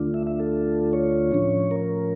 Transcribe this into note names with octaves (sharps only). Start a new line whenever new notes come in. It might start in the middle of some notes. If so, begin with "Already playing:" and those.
Already playing: D2 D3 A3 D4 F4
E5
E5
A4
C#5
A2 F3 C#4
A#4